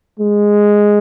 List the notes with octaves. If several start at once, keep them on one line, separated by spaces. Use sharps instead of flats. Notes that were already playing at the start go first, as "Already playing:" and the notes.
G#3